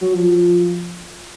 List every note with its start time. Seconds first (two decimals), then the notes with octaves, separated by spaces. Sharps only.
0.02 F#3
0.14 F3